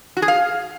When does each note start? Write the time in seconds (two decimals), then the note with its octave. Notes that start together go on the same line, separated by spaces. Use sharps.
0.17 F#4
0.22 G#4
0.28 F5